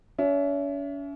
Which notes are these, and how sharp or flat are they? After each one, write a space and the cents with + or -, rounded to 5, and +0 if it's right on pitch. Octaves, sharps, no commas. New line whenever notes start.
C#4 +40 E5 +15